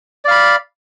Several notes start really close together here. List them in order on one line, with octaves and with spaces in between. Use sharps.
D5 F5 B5